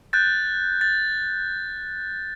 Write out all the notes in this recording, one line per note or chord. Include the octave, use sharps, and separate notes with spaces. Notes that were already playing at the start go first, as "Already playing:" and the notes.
F#6 G6 A6
A6